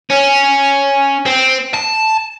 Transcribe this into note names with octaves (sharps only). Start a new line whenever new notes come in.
C#4
C4
A5